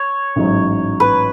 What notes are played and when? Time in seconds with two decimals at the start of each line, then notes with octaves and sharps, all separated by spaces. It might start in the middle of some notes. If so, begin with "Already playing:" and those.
Already playing: C#5
0.36 A1 G#2 F#3
1.00 B4